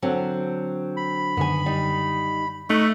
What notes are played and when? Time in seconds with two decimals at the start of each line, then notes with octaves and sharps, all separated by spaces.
0.02 D3 F#3 C4
0.97 B5
1.37 F#2 D3 D#3 B3 G#5
1.66 G3 D#4
2.70 A3 D#4 E5 C#6 F#6